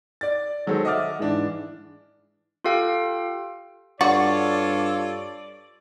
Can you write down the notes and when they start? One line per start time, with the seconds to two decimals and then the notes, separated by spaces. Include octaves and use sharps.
0.21 D5 A6
0.67 D#3 F#3 G#3 A4 C5
0.85 D#5 E5 F#5 D6 F6 A6
1.19 G#2 E3 D4
2.64 F4 G4 A4 F5 G5
4.01 G2 F4 F#4 A4 C#5 D5